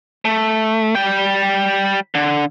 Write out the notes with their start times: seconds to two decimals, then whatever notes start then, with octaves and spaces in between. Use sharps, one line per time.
0.25 A3
0.95 G3 G5
2.15 D3